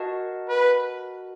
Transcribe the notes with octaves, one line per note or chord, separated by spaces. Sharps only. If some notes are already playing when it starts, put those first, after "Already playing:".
Already playing: F#4 A#4 D#5 F#5 A5
B4